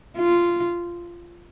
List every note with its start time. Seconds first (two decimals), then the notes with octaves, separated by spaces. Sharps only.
0.17 F4